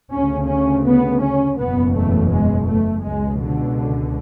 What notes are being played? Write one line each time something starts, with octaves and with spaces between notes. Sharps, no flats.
D2 C#3 C#4
C#4
B3
C#4
F#1 E2 B2 B3
A3
G#3
A3
C#2 B2 G#3
D3